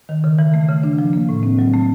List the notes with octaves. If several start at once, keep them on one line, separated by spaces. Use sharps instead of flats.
D#3
C#3
E3
A3
C#3
D4
F3
A#3
A2
C4
F#3
A3